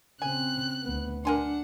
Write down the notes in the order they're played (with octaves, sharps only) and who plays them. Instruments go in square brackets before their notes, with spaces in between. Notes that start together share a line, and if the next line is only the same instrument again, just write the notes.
[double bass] C#3 C4 [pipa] G#5 [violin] F#6
[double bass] D2 B3
[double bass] D4 [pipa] A#4 G#5 C6 [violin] F#5